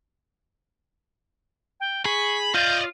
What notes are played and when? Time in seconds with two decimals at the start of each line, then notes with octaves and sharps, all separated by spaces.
1.80 G5
2.05 G#4 B5 C#6
2.54 F4 D5 D#5 F5 G6